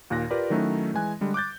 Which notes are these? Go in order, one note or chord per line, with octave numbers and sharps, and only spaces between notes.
D#2 A#2 F#6 A#6
F4 G4 A#4 B4 D5
D#3 F#3 A3 C#4 D#4 E4
E3 G#3 G#5 F#6
D3 G3 G#3
D6 F#6 G6 A6